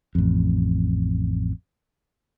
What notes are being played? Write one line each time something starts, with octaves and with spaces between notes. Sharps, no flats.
A1 F2